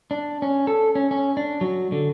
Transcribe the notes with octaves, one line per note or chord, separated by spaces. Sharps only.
D4
C#4
A4
C#4
C#4
D4
F#3
D3